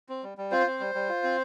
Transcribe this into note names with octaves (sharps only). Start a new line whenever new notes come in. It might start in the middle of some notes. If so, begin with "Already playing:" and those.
C4
G3
G3
C4 F4 C5
C4
G3
G3
F4
C4